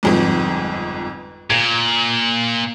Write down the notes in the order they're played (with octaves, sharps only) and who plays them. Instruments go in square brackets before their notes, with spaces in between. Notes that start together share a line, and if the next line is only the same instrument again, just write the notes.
[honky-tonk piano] G1 F2 G#2
[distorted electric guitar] A#2 [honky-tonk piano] G#6